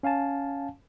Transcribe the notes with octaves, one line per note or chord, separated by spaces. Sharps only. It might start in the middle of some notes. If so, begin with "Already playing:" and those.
C#4 F5 G#5 A5